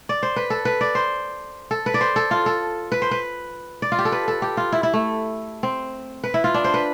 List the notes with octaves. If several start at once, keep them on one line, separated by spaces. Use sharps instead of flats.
D5
C5
B4
A4
B4
D5
C5
A4
B4
D5
C5
A4
F4
A4
B4
C5
B4
D5
F4
G4
A4
B4
A4
G4
F4
E4
E4
A3
C4
B4
E4
F4
D4
C5
B4